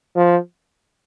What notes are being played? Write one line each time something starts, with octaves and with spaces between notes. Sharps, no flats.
F3